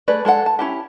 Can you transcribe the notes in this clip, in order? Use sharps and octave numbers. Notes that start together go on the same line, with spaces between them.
A3 G#4 A4 B4 D5
G#3 A4 C5 F#5
A5
C#4 E4 G4